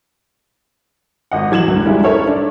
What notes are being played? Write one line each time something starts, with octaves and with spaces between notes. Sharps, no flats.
G#1 D#5 F#5
E3 F#3 G#6 E7 F#7
C#2 G2
G3 G#3 C#4 D4 E4 F4
A4 A#4 C#5 E5
D4